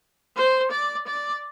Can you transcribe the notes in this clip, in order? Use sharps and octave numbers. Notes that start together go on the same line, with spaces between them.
C5
D5
D5